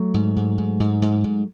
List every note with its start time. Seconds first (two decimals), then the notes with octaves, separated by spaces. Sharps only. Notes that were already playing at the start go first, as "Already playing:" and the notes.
Already playing: F#3 A3
0.14 G#2
0.37 G#2
0.58 G#2
0.80 G#2
1.02 G#2
1.24 G#2